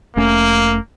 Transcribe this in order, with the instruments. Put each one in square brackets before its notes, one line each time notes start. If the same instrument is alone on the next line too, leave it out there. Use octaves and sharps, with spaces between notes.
[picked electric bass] F1 A3 C#4 [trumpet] A#3